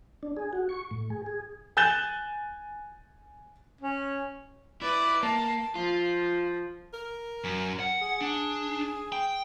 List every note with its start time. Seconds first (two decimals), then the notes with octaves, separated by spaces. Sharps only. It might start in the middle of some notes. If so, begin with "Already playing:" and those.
0.23 D4
0.37 G#4
0.53 F#4
0.69 C#6
0.91 A2
1.10 G#4
1.26 G#4
1.77 G#5 F#6 G6 A6 E7 G7
3.81 C#4
4.82 E4 B4 D5
5.23 A#3 A5
5.75 F3 F4
6.93 A#4
7.44 F#2
7.80 F#5
8.02 G#4
8.21 D4
9.12 G5